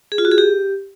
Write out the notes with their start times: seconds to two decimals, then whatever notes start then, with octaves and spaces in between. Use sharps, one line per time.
0.12 G#4
0.18 F4
0.25 F#4
0.31 G#4
0.38 G4